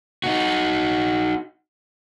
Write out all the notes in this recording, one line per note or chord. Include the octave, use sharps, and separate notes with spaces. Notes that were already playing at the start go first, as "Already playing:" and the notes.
D#4 F#4